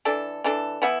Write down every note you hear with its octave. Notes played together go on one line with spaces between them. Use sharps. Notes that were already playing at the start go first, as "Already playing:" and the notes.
E3 D4 A4
E3 D4 A4
E3 B3 E4